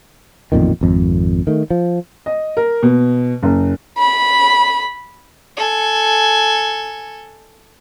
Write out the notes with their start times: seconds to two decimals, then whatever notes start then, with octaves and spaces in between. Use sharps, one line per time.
0.52 A1 F2 A#2 D#3
0.81 G#1 F2
1.47 D#3 A3
1.70 F3
2.26 D#5
2.57 A#4
2.83 B2
3.43 F#1
3.98 B5
5.56 A4 G#5